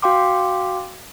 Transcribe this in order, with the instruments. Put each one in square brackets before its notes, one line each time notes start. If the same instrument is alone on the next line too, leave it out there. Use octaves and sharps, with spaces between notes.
[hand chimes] F#4 F5 G5 C6 D6